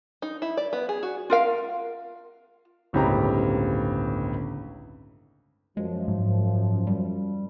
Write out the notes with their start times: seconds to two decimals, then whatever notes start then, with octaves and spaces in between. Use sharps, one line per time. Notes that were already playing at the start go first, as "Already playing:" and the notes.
0.22 D#4
0.42 E4
0.57 D5
0.73 B3
0.89 G#4
1.03 F#4
1.30 F4 A#4 F5
2.93 G1 C#2 A2 C4 G4 A#5
5.77 F#2 F3 G#3
6.08 G#2
6.87 G3